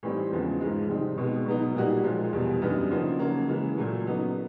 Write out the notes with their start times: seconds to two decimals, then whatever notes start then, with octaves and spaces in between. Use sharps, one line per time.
0.03 A2 E3 G3 C4 D#4
0.32 E2 C#3 F3 G#3 B3
0.60 G#2 F3 G#3
0.89 C3 D#3 G3 C4 D#4
1.18 B2 G#3 B3
1.46 B2 F#3 B3 D#4
1.75 A#2 G3 A#3 D#4 F#4
2.04 A#2 F3 G#3
2.33 E2 B2 G3
2.61 F#2 D3 G3 B3 D#4
2.90 C#3 F3 A#3 D#4 F#4
3.19 C#3 F#3 A#3 C#4 F#4
3.48 C#3 E3 G#3
3.77 A#2 F#3 A3
4.05 C#3 F#3 B3 D#4